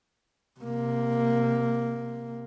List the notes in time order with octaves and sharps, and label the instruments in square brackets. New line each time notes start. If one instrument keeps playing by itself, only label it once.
[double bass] C3 A#3